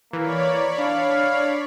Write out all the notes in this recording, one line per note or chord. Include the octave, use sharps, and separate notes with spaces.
E3 A#3 C#5 D5 B5
D4 F5